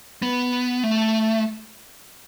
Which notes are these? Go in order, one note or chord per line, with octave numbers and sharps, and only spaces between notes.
B3
A3